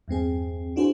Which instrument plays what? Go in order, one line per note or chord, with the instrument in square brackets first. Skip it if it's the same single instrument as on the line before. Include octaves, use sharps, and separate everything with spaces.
[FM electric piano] E2 G2 C4 G#4
D4 E4 F#4 G#4 B4 C5